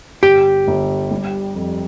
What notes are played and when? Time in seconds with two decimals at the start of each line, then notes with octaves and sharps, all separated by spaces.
0.23 G1 G4
0.67 G1
1.11 G3
1.55 F2